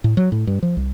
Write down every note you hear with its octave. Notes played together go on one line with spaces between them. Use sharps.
A2
F#3
A2
G2
F3
C2